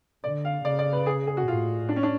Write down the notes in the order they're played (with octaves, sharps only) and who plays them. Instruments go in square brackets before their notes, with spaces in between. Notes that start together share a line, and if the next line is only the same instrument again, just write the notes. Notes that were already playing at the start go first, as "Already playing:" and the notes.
[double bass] D3 [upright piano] D5
[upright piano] F5
[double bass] C#3 [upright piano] D5
[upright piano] D5
B4
G#4
G#4
F#4
[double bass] A2 [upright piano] F4
[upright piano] D4
C#4
D4